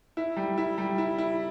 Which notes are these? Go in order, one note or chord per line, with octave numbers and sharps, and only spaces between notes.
E4
G3
E4
G3
E4
E4